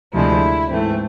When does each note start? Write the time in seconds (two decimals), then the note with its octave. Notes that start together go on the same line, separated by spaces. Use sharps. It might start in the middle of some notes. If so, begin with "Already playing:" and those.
0.13 D2 C3 F3 G#3 E4
0.70 G#2 E3 A3 C4